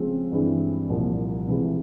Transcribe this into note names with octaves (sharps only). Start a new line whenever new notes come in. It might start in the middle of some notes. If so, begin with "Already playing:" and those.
Already playing: C#3 F3 G#3 C4
G2 E3 G#3 C4
C2 A#2 F3 A#3
C3 E3 G#3